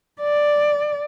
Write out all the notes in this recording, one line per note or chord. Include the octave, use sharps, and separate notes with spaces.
D5